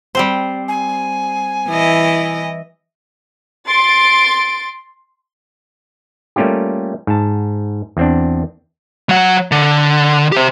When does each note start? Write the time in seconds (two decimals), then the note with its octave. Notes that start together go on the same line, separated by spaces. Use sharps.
0.15 G3 C4 C5
0.68 G#5
1.68 E3 E4 D#5
3.67 C6 A6 D7
6.36 G3 A3 A#3 C#4 F4 G4
7.07 G#2 A5
7.97 E2 C4 D4
9.09 F#3 F#5
9.52 D3
10.32 G4 C5